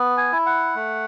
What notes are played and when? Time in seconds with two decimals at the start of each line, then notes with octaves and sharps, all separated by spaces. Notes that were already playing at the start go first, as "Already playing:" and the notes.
Already playing: B3
0.17 G#5
0.32 E4
0.46 F#5
0.75 A3